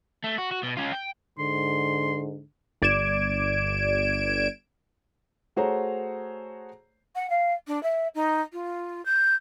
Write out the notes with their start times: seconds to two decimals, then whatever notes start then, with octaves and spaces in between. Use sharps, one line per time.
0.24 A3
0.38 F#4
0.51 F#4
0.63 B2
0.77 C#4 F4
0.92 G5
1.39 G#2 D3 C6
2.82 G1 D5 G#6 D7 E7
5.56 A3 F#4 G#4 C5 C#5 A#5
7.16 F#5
7.30 F5
7.67 D4
7.83 E5
8.15 D#4
8.53 F4
9.06 G6